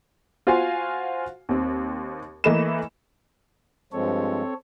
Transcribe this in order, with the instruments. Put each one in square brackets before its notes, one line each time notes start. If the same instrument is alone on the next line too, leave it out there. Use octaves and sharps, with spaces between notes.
[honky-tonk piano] F4 F#4 C5 F5 G#5
D#2 C4
E3 A3 A#3 D#5 B5 E7
[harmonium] G2 F3 G#3 [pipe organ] C4 A4 C#5